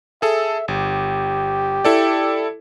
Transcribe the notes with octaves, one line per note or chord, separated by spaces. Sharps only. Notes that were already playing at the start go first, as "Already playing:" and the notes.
G#4 A4 E5
G1 G4
E4 A4 D5